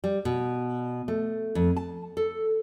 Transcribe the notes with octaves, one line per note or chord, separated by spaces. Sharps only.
G3
B2
A3
F2
A5
A4